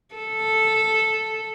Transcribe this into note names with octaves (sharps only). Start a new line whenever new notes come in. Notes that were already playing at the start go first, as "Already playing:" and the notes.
A4